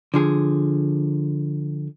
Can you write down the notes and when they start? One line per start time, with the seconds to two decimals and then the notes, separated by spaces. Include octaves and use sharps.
0.14 D3 F3 G#4